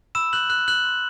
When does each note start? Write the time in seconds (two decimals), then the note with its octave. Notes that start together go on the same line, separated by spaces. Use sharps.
0.15 B5 E6 E7
0.33 E6 F#6 G6 F#7
0.50 B5 F#6 F#7
0.68 E6 F#6 G6 F#7
0.85 C6